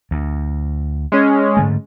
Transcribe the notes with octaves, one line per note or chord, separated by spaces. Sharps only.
D2
G#3 C#4
G#2 D3 A3